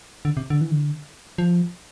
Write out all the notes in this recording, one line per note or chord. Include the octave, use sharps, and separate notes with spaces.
D3
C3
D3
E3
D3
F3